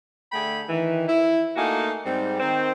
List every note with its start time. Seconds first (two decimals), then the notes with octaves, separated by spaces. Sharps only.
0.32 D3 A3 G#4 G5 B5
0.69 D#3 E3
1.07 E4
1.56 A3 A#3 D#4 F#4 F5 G#5
2.05 G#2 G3 C4
2.40 D#3 C4 C5